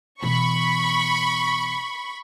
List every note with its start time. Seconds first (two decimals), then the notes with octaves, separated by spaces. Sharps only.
0.22 B2 E3 B5 C#6